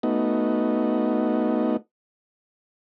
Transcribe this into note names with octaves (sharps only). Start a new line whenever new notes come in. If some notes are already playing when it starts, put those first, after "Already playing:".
A3 B3 D#4 F#4